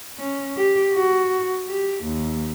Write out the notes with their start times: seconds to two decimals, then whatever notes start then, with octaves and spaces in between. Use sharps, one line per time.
0.19 C#4
0.57 G4
0.94 F#4
1.69 G4
2.04 D#2